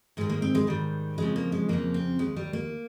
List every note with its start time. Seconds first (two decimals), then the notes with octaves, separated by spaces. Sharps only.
0.17 G#2 D#3 G#3
0.29 A#3
0.42 C4
0.55 G#3
0.67 G#2 D#3 G3
1.18 F2 C#3 F3 G#3
1.36 A#3
1.52 G#3
1.68 F2 C#3 F3 A#3
1.94 C4
2.19 D#2 D#3 G#3
2.37 G3
2.53 A#3